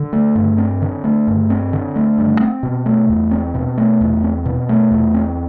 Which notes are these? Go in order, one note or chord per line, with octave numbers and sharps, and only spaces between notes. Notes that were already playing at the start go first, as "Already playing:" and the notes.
Already playing: D3
A3
G2
C4
D3
A3
G2
C4
D3
A3
G2
C4
B2
A3
E2
C4
B2
A3
E2
C4
B2
A3
E2
C4